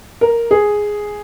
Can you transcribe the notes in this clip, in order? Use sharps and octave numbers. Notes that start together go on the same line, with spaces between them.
A#4
G#4